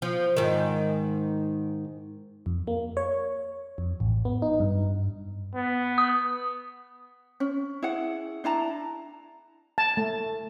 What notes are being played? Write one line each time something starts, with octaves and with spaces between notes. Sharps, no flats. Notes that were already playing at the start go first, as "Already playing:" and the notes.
F3
G#2 D#3
F2
A#3
C#5
F2
A1
B3
D#4
G2
B3
D#6
C#4
E4 G#4 F#5
D4 E4 A5 A#5
A5
A3